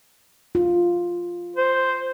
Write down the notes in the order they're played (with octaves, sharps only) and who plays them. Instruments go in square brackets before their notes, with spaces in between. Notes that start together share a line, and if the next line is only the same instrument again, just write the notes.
[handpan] F4
[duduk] C5